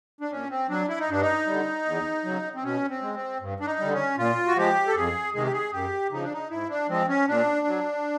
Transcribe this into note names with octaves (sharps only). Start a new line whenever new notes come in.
D4
A#2 C#4
C4
F#3 D4
E4
D#4
G2 D4
D#4
D3 G3
E2
C#3 F#3
C4
B2 C#4
C4
G#3
C4
G2
D4
D#4
D3 G3
C#4
A#2 F4
F#4
F3 G#3 G4
A4
F2 G#4
C3 D#3 G#3 G#4
G4
G#4
F#2 G4
C#3 F3 D#4
D4
D#4
G#2 E4
D4
F3 G#3 C4
C#4
A#2 D4
F#3